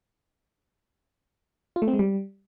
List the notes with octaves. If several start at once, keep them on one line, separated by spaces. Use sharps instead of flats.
F4
A3
C4
G#3
G3